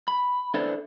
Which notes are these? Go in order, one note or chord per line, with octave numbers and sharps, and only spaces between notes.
B5
D4 E4 A4 B4 C5 D5